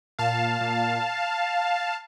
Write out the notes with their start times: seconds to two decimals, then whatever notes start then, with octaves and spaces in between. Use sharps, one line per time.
0.19 A#2 F5 A5
0.61 A#2